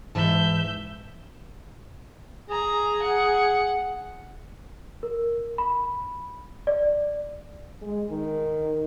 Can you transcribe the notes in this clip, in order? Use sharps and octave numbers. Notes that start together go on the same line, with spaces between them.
G#2 E3 E5 A5 G6
G#4 A#5
F#5
A#4
B5
D5
G#3
D#3